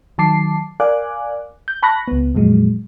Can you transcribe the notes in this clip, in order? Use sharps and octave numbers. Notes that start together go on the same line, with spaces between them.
D#3 F#3 A5 D6 C7
A#4 D5 F5 G#5 D6 F#6
G6
A5 B5 C#6 F#6 A#6
C#2 B3
F2 A#2 F#3 G#3